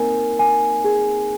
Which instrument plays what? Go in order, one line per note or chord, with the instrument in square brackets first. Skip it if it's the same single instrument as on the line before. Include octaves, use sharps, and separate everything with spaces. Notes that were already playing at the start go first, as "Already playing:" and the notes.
Already playing: [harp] A#3 C4 D#4 [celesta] A#4 G#5
[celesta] G#5
G#4